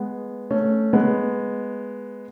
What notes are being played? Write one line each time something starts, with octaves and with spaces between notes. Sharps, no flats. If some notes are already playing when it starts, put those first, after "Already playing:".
Already playing: G#3 B3
A3 C#4
G#3 B3